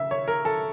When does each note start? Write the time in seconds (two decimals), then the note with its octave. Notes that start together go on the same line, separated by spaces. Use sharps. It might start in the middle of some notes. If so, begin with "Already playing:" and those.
Already playing: C#3 E5
0.11 C#5
0.28 A#4
0.45 A4